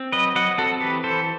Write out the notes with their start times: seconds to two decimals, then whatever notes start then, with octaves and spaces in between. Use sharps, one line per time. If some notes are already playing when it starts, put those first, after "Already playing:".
Already playing: C4
0.12 F#3 B4 D#5
0.35 F#3 D#5 F#5
0.58 C4 F#4 A4
0.80 E3 G4 B4
1.04 E3 A4 C5